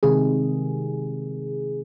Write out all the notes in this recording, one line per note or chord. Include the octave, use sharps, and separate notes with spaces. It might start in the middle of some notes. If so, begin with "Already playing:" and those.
C3 D#3 G#3 G#4